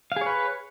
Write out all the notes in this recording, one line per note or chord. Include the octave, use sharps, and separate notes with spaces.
G#4 B4 C#5 F5